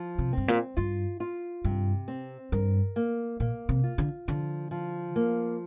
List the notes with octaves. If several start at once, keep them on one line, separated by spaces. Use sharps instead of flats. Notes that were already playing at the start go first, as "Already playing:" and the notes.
Already playing: F3
C3
G2 C4
A#2
G2 F4
F4
G2 C3
C4
G2 A#4
A#3
A#2 A#3
C3
F4
D3
D3 F3
F3
A#3